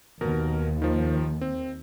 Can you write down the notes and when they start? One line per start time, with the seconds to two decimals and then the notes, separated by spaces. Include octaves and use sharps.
0.21 D#2 B2 A#4
0.82 D#3 F3
1.41 C4